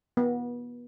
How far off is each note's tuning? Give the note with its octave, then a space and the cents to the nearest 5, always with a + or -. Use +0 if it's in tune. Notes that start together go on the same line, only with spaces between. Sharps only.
B3 -30